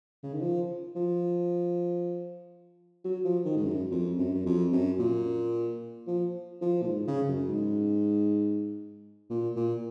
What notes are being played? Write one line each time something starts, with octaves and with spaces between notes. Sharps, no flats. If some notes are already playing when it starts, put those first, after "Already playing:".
C#3
D#3
F3
F3
F#3
F3
D#3
G#2
F#2
F2
F#2
F#2
F2
F#2
A#2
F3
F3
A#2
G#2
C#3
F#2
G#2
A#2
A#2